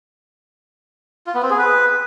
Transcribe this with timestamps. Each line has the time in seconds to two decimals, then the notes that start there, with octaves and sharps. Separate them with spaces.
1.27 F4
1.35 B3
1.43 C4
1.51 G#4
1.58 B4